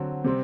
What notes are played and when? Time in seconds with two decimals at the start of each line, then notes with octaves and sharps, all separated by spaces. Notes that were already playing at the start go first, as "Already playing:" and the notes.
Already playing: D3 F#3 C4
0.24 C3 G3 C4